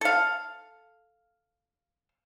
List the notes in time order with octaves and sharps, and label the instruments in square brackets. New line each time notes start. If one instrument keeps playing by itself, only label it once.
[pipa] A4 F5